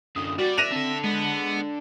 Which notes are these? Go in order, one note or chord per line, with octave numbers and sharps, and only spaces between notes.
F#2 D3 D#6
G3 F#4 D5 A6
E5 F#6 A#6 D#7 F7
C4 D4 A4
G#3 B3